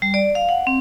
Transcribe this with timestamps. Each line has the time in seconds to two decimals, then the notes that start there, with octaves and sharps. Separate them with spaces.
0.02 G3
0.14 D5
0.35 F5
0.49 F#5
0.67 C4